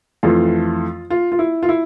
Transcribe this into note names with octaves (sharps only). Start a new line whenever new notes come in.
F2 E3 A3 F4
F4
F4
E4
F4
E4